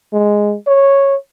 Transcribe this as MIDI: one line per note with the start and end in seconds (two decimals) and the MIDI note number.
0.13 0.54 56
0.67 1.16 73